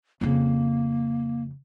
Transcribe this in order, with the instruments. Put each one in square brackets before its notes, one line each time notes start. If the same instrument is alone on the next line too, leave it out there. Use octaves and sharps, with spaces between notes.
[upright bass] F2 C#3 [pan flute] A#3